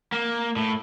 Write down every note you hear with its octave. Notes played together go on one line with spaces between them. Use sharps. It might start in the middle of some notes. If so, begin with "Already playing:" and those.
A#3
A2